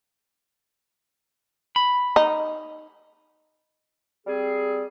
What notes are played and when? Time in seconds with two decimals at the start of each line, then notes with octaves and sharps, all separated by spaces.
1.76 B5
2.16 D#4
4.27 G3 C4 G#4